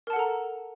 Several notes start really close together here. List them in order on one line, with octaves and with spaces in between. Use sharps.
A#4 A5 F#5 A4 A#5